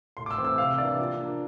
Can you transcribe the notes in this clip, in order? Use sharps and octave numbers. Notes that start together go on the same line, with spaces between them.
A2 C6
D6
E6
E3 A3 C4
E6
C3 F5
E3 A#3 D4 D5
F3
A#3 D4